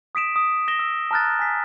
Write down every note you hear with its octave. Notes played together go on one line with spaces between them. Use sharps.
D#6 B6 D7 E7
D#6
A#6 E7 G7
E6
A5 A#5 F6 F#6 A6
G#5 B6